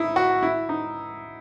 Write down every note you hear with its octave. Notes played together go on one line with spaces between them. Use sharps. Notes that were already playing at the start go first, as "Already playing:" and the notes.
Already playing: D#4 E4
F#4
E4
D#4